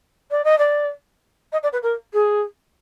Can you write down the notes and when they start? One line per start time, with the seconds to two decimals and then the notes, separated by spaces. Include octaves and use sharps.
0.30 D5
0.44 D#5
0.58 D5
1.52 D#5
1.63 D5
1.72 B4
1.82 A#4
2.13 G#4